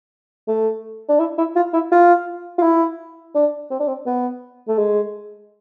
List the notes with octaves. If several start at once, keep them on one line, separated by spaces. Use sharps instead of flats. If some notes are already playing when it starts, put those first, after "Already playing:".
A3
D4
E4
E4
F4
E4
F4
F4
E4
D4
C4
D4
C4
B3
A3
G#3